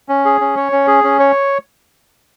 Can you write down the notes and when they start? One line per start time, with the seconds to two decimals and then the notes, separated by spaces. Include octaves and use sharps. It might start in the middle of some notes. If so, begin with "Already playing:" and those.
0.09 C#4
0.25 G#4
0.41 C#4
0.57 C#5
0.72 C#4
0.87 G#4
1.04 C#4
1.20 C#5